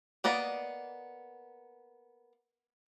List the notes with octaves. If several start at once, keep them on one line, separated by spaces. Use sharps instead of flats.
A#3 B3 D5 D#5